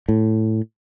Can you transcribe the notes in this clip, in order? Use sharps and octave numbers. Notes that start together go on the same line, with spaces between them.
A2